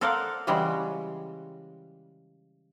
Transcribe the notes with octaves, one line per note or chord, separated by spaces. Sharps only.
A4 A#4 C5 D5 F5 F#5
C#3 E3 G3 G#3 F#4